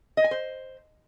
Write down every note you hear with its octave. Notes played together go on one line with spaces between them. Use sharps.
D#5
G#5
C5